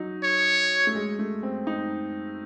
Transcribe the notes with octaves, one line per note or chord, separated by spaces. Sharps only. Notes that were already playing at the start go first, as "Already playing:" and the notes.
Already playing: F#3 D#4
C#5
A3
G#3
A3
C4
D#4